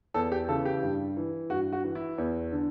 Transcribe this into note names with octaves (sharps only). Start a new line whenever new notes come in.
E2 A4
G4
C#3 E3 A4
G4
G2
E3
G2 F#4
F#4
E3
E4
E2
D3